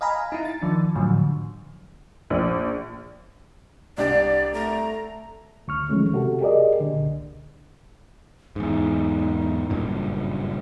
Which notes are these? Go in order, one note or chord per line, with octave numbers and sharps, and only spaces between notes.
D#5 F5 G#5 A#5 B5
D#4 E4
A6
D#3 F3 D4
A2 D3 F3 F#3
A#1
C2 D4 G4 D5
A3 A#5
D2 C#6 F6
D#3 F3 F#3 G#3 A3 C#4
C3 F#4 G4 A4
G4 G#4 A#4 D5 D#5
A#2 D3
C2
E2 G#2 D#4
F#1 G2 A#2